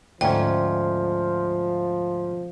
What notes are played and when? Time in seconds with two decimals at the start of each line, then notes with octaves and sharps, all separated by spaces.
0.21 D2 G#2 F3 C#4 G5